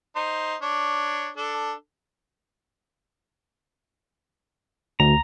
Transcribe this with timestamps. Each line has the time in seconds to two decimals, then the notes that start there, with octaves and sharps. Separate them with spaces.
0.16 D#4 C5
0.62 D4 C#5
1.37 D4 A4
5.00 D2 A#5